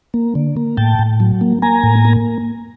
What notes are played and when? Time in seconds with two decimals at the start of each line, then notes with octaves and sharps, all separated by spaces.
0.14 A#3
0.35 D3
0.57 A#3
0.77 A2 G5 A5
0.99 A2
1.20 F#3
1.41 A#3
1.62 A#3 G#5 A#5
1.83 A2
2.05 A#3